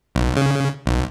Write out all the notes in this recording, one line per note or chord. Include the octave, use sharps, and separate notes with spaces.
B1
C#3
B1